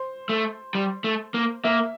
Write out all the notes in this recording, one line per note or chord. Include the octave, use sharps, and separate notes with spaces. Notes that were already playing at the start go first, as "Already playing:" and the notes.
Already playing: C5
A3
G3
A3
A#3
A#3 E5